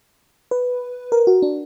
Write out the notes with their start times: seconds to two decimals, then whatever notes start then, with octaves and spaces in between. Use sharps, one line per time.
0.51 B4
1.12 A#4
1.27 F#4
1.42 D4